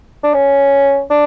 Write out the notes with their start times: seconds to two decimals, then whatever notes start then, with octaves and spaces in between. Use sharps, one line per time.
0.23 D4
0.34 C#4
1.10 D4